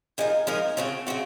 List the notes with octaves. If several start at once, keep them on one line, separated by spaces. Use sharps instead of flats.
F3 G#3 D#4 A#4
F3 G#3 D#4 A#4
C#3 F3 C4 F#4
C#3 F3 C4 F#4